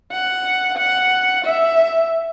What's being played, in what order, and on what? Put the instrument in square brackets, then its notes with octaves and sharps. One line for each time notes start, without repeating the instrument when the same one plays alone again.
[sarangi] F#5
F#5
E5